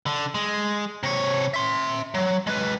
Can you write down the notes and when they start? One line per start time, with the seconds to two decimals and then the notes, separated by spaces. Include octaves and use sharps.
0.06 D3
0.35 G#3
1.03 C3 C#5
1.54 E5 C6
2.14 F#3
2.47 G#3 B4